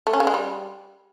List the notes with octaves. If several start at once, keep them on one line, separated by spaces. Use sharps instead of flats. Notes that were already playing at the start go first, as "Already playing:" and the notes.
A3
C#4
C#3
G#3
G3